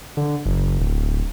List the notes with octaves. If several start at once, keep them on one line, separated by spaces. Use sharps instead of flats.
D3
F#1
D1